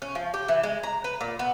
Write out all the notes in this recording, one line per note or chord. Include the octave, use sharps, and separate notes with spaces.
C#4
F3
G4
E3
G#3
A#5
B4
A#2
B3